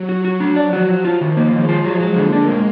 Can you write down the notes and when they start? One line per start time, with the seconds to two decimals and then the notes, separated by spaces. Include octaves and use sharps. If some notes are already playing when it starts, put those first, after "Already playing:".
Already playing: F#3
0.09 F#4
0.25 F#3 F#4
0.40 D4
0.56 F3 D5
0.73 F#4
0.89 F3 F#3
1.05 F4
1.20 D#3 F3
1.37 A#3
1.52 D#3 G#3
1.69 F4
1.84 F#3
2.00 F#3
2.16 D3 A#3
2.33 D4
2.48 G#3